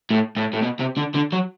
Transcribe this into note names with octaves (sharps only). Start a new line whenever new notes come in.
A2
A2
A2
B2
C3
D3
D3
F#3